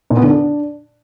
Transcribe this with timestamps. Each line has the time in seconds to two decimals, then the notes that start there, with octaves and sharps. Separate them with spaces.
0.10 A#2
0.16 B3
0.22 D3
0.29 D4